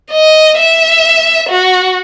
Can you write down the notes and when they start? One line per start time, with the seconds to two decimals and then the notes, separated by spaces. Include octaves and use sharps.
0.12 D#5
0.58 E5
1.50 F#4